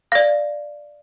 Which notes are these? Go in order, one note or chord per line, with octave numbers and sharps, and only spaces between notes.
D5 F5